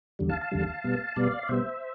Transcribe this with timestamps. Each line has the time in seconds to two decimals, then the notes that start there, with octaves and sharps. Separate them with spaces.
0.19 E2 D3 G3
0.29 F5 A5
0.41 F5 A5
0.52 E2 D3 G3
0.84 B2 G3 B3
1.16 B2 G3 B3 D5 F5
1.43 D5
1.48 B2 G3 B3 C5 E5